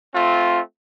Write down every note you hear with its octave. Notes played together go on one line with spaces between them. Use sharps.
A3 C4 F4